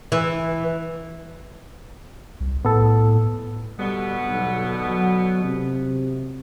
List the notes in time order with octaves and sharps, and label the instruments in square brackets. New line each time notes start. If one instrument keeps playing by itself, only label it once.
[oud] E3
[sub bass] C2
[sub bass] A2 [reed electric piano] B3 A4
[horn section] B2 D3 B3 [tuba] G3
[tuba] B1
F#3
C3